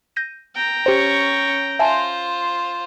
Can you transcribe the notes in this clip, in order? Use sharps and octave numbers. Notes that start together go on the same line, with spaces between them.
G6 A#6 D#7
G5 A#5
C#4 G4 C5 C#6
F4 C5 E5 G#5 A5